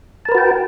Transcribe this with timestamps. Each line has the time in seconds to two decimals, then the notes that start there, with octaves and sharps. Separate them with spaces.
0.25 A5
0.29 A#4
0.32 B4
0.35 F#4
0.38 G5